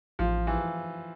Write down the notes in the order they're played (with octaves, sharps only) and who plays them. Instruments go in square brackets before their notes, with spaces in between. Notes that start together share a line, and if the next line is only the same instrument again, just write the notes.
[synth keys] A1 [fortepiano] F3
[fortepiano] E3